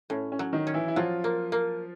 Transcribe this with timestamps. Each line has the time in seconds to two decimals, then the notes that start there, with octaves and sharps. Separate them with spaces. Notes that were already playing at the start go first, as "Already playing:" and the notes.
0.10 A2 C#4
0.32 C#4
0.39 F#3
0.53 D#3 D#4
0.67 C#4
0.74 E3 E4
0.88 E4
0.96 F3 F#3 F4
1.24 A#3
1.52 A#3